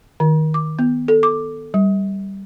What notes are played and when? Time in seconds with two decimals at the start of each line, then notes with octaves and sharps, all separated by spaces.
0.20 D#3
0.54 D6
0.79 B3
1.08 A4
1.23 D6
1.74 G3